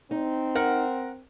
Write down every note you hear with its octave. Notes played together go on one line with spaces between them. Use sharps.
C4 D#4
A#4 F#5